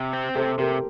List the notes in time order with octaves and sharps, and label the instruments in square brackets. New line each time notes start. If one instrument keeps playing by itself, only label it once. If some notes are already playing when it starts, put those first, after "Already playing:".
Already playing: [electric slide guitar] C3
C4
[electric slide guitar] C3 [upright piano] A4 C5
[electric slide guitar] C3 [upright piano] G4 A#4